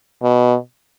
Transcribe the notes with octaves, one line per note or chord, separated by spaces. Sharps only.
B2